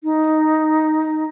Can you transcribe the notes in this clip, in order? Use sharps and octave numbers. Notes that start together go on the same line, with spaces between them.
D#4